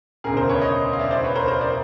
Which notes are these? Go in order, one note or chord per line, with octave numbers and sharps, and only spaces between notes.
E1 D2 C#3 G#4 A#4
A#4 C5
B4 C#5
C#5 D#5
F5
D5 E5
C5 D5
B4 C#5
A#4 C5
A#4 C5
C5 D5